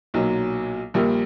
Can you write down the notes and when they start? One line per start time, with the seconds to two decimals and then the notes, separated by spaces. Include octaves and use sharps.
0.14 B1 A#2 F#3
0.94 A#1 A#2 G3 A#3